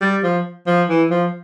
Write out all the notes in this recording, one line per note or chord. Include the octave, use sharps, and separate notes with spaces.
G3
F3
F3
E3
F3